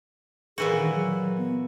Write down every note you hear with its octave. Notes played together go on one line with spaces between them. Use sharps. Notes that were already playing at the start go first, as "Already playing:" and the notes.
A#2 E3 F#4 G#4
D#3
F#3
B3